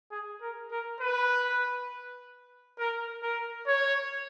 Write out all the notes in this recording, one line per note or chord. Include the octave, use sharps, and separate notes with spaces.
G#4
A#4
A#4
B4
A#4
A#4
C#5